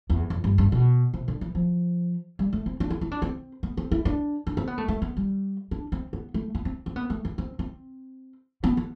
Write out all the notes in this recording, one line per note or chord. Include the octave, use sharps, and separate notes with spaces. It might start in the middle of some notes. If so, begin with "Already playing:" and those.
E2
F2
G2
G2
B2
C3
D3
E3
F3
G3
A3
C4
D4
E4
E4
D4
C4
B3
C4
E4
D4
D4
C4
B3
A3
A3
B3
G3
D4
C4
B3
A3
B3
C4
C4
B3
A3
B3
C4
C4
B3
B3